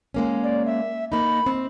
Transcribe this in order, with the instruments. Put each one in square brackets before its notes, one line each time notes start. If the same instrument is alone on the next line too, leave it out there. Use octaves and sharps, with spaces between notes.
[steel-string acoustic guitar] G#3 A#3 C#4
[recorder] D5
E5
[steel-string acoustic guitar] A#3 D#4 [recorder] B5
[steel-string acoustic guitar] C4